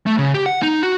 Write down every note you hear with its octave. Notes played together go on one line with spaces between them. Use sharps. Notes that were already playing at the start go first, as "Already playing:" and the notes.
A3
C#3
G4
F#5
D#4
F#4